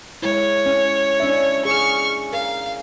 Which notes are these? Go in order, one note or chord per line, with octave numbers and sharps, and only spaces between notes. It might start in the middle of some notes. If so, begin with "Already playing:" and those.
G#3 E4 C#5
C#4
C#4 D4 E5
G#4 C#6 F6
A#4 F5